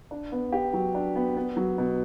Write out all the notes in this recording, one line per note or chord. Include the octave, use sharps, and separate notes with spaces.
D4
B3
G4
F#3
D4
B3
B3
F#3
B2